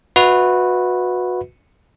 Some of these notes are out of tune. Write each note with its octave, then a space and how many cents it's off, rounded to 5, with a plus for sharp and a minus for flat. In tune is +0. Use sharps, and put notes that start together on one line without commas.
F#4 -25 B4 +0 E5 -45